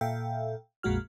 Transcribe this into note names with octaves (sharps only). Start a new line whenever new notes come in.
A#2 A4 E5 F5 G5
A#1 F2 A#2 G#3 F#4 F6